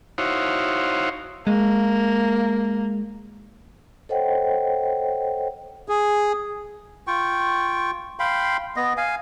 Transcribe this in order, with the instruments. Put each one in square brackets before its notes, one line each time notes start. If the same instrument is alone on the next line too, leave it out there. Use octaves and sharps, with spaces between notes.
[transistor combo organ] D#4 E4 F#4 C5 C#5 F5
[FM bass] G#3 [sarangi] A#3
[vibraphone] A4 C5 C#5 D#5 F#5 G5
[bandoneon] G#4
[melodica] F4 G5 C#6
F5 G5 B5 C6
B3 D#5
F5 G#5